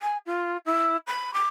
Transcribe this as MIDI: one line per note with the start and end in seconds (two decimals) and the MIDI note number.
0.01 0.17 80
0.26 0.57 65
0.66 0.97 64
1.07 1.33 83
1.34 1.48 86